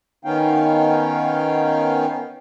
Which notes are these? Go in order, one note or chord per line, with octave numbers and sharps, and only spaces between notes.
D#3 B3 C#4 D#4 F5 G5